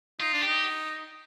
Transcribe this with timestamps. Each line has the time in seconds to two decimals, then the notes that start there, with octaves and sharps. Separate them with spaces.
0.20 D#4 F4
0.33 D4
0.43 D#4 G4